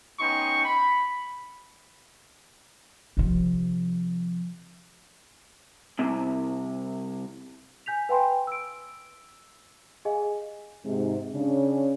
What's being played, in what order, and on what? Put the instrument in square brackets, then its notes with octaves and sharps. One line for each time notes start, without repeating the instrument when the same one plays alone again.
[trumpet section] B3 C#4 D#4 G5 C6 C#6
B5
[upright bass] C3 F3
[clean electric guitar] C2 C3
[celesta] G#5 G6 B6 F7
B4 F5 G5 G#5 B5 C6
E6 D7
G4 G#4 D#5 F5 G#5
[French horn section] G#2 C3
C#3 C#4 D4